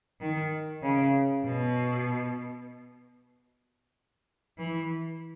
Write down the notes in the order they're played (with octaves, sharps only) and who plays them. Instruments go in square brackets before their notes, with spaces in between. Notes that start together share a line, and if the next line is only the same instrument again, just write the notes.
[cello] D#3
C#3
B2
E3